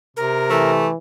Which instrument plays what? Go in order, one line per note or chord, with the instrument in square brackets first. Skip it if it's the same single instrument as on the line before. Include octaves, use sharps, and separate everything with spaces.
[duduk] C3 [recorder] A#4
[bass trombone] E3 [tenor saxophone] A3